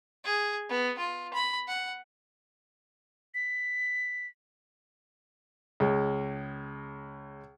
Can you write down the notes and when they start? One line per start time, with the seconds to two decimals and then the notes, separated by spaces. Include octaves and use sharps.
0.24 G#4
0.69 B3
0.98 F4
1.33 B5
1.68 F#5
3.34 B6
5.80 C#2 G#3